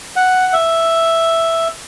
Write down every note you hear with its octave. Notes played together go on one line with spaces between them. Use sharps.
F#5
E5